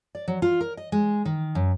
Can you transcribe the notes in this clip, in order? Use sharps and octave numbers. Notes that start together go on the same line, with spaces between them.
D5
F#3
F4
A#4
D#5
G#3
D#3
F#2